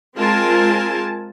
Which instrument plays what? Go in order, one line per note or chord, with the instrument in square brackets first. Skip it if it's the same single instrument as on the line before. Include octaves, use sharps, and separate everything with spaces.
[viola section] G#3 C4 F4 A#4 G#5 A5